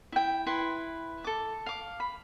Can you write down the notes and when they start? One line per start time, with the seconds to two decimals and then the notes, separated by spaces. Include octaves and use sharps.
0.12 E4 G5
0.47 E4 B4 C6
1.24 A4 D6
1.66 F5 D6
2.00 B5